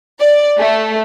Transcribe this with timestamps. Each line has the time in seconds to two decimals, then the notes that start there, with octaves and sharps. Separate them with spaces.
0.19 D5
0.58 A3